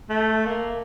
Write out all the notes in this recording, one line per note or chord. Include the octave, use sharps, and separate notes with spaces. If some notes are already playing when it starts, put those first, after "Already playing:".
A3
A#3